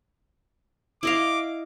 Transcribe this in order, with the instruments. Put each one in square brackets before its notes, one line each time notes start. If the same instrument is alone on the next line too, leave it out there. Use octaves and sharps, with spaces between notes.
[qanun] E4 D#5 F5 [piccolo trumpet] D6